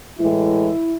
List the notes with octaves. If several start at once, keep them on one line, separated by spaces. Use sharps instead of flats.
A2 E3 G#3 E4